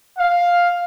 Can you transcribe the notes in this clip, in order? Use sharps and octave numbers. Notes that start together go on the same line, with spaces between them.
F5